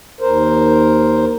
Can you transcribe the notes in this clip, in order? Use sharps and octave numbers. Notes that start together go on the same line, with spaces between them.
D#2 A#4 C5